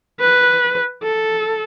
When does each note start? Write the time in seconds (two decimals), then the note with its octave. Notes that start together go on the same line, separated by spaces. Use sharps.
0.20 B4
1.03 A4